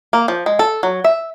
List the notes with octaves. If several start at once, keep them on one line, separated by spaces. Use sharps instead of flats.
A#3
F3
G#3
A4
F#3
E5